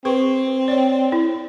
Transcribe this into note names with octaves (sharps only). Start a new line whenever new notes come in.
C4 G#4 B4 C#6
C#5 D5
E4